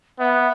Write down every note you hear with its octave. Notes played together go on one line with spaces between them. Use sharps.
B3 E5